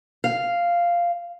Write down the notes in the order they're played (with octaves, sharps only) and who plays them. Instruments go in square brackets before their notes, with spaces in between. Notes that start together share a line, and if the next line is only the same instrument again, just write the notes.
[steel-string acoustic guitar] F5